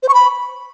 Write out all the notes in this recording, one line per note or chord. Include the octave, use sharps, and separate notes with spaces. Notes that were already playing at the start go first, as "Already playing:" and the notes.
C5
C#6
B5